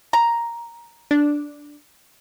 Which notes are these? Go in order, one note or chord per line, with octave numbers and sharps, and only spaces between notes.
A#5
D4